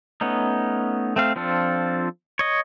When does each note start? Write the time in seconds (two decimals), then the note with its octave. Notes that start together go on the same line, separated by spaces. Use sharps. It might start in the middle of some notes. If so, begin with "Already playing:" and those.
0.21 A3 B3 C#4 D#4
1.16 A3 C4 F5
1.36 F3 C4 D4 F4 A4
2.39 C#5 D#5